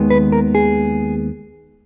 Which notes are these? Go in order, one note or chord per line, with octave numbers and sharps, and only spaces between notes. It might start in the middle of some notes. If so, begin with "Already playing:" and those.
Already playing: D#2 D#3 G#3 B3
B4
A#4
G#4